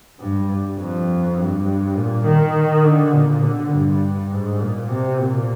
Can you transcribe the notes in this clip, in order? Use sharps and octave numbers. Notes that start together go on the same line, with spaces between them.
G2
F2
G2
A#2
D#3
D3
A#2
D3
G2
G#2
A#2
C3
A#2